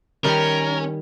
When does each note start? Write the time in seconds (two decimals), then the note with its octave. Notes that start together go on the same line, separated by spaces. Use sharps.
0.25 D#3 G3 C#4 A#4